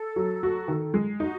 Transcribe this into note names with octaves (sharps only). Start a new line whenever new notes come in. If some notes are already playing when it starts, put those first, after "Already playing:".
Already playing: A4
F#3
F#4
D#3
G#3
D#4 F#4